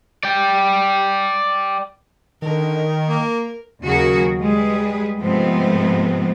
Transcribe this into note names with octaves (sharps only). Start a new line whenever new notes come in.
D5 G5
D3 D#3 A#4
A#3
D#2 C#3 F#3 F#4 G#4 A#4
G3 G#3 G#4 B4
G#2 C3 F3 A3 B3 C4